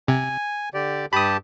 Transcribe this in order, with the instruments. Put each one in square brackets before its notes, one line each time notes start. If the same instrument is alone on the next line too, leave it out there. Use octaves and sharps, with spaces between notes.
[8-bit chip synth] C3 [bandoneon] G#5
[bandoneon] D3 G4 D5
[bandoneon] G2 G4 A5 [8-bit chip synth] B5 D#6